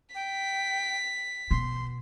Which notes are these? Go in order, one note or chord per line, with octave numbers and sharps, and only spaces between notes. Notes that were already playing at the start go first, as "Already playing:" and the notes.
G5 B6
B2 C6